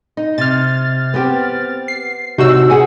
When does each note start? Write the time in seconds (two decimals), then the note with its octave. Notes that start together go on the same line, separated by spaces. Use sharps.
0.17 D#4
0.38 C3 F6 A6
1.14 B3 C4 G4
1.88 C7
2.38 C3 D#4 F#4 C#5 E6
2.70 G#4 F#5 G#5